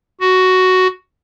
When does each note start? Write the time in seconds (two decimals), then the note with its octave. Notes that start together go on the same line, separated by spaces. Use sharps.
0.21 F#4